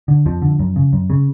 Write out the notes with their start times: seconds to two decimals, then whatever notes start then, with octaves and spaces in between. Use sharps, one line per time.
0.08 D3
0.26 F2 F3
0.42 D3
0.59 F#2
0.76 C#3
0.93 F#2
1.10 C#3